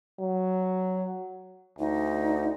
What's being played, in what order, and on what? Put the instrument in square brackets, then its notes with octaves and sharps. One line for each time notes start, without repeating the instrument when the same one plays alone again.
[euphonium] F#3
[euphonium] D2 [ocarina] D#4